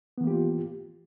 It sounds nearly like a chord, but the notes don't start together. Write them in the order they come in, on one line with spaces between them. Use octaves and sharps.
B3 E3 A#3 G4 F4